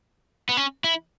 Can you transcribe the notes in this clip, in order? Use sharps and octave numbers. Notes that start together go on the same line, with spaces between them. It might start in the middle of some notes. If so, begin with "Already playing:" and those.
B3
C#4
E4